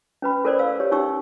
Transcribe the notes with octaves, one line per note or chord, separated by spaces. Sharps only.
C#4 B4 B5
A4 A#4 C5 D5
F5 E6
G4 C#5
C#4 D#4 G4 C#5 C#6 E6